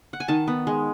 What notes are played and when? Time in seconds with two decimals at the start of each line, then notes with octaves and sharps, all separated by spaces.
0.13 F#5
0.20 G#5
0.28 D#3 A5
0.47 B3
0.67 G#3